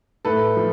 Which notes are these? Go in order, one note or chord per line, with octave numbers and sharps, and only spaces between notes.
A2 A4 B4
F3